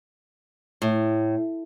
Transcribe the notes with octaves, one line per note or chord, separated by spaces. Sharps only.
A2